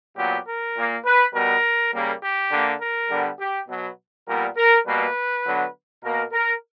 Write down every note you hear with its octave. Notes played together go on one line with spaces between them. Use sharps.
A#2 F#3 B3 G4
A#4
A#2 A#3
B4
B2 G3 B3 A#4
C#3 G3 A#3
G4
D3 A#3
A#4
D3 G3 B3
G4
B2 F#3 B3
A#2 G3 B3 A#4
A#4
B2 G3 A#3 B4
D3 F#3 B3
B2 A#3 A#4
A#4